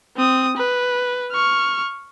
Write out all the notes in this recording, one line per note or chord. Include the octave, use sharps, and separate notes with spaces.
C4 D#6
B4
C#6 F6